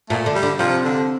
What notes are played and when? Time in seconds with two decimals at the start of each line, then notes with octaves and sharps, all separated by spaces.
0.10 A#2 A3
0.26 D3
0.35 G3
0.43 D3
0.59 C3 F3
0.84 D3